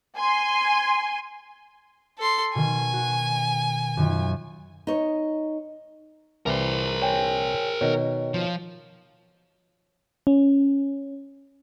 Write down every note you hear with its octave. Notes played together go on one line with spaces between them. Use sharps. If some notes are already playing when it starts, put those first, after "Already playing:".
G#5 C6
A4 C6
B2 D#3 G#5
F#4
F#2 D#3 F4
D#4 C#5
C2 E3 A#4 C5 D5
C#5 G5 G#5
B2 D#3 C#5
F3
C#4